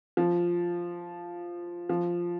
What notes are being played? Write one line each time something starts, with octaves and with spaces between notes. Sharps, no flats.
F3
F3